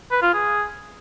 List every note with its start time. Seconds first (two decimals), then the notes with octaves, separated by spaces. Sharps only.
0.11 B4
0.23 F4
0.34 G#4